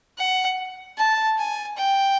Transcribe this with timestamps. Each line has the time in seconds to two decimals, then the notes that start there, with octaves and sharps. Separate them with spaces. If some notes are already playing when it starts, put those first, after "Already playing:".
0.18 F#5
0.98 A5
1.38 G#5
1.77 G5